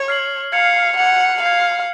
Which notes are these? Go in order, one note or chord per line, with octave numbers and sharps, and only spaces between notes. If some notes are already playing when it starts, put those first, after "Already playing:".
Already playing: C#5
F6 C7 F#7
F5 G#6 C#7 F7
F#5 G#6 C#7 F7
F5 G#6 C#7 F7